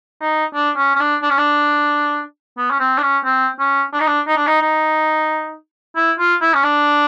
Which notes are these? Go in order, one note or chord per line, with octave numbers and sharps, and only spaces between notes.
D#4
D4
C#4
C#4
D4
D4
C#4
D4
B3
C#4
C4
D4
C#4
C4
C#4
D4
D#4
D4
D#4
D4
D#4
D#4
E4
F4
E4
C#4
D4